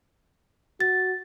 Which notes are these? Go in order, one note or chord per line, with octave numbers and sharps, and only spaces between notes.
F#4 A6